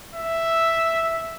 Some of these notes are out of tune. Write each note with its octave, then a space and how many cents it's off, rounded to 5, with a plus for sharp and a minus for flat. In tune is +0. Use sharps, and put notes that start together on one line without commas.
E5 +0